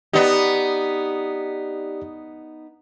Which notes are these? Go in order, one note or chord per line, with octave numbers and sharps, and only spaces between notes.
B3 D#4 G4 D5